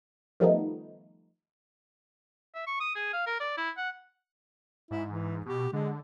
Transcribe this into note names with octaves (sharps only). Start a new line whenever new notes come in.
D#3 F3 G3 A3 B3 D#4
E5
C#6
D#6
G#4
F5
A#4
D5
E4
F#5
G#2 E4
E3
B2 G4
D3 G#3